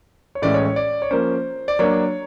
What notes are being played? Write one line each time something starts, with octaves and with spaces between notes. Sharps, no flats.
C#5
A2 E3 G#3 C#4 E4 D5
C#5
C#5
D5
C#5
F3 A#3 C#4 C5
D5
F#3 A#3 D4 C#5